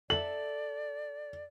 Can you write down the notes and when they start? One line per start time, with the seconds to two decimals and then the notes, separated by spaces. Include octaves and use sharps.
0.10 A4 D5 E5 F#7